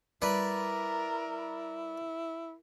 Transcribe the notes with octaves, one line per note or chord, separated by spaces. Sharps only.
G3 E4 A#4 B4 D5